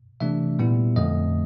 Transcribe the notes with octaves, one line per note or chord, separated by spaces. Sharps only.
C3 E3 A3 D4 E5
A#2 G3 B3 E4
F2 D3 F3 A3 D#5